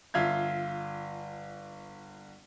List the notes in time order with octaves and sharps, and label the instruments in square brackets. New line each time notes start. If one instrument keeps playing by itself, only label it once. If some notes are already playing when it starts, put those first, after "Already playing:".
[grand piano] G1 F4 E5 G#6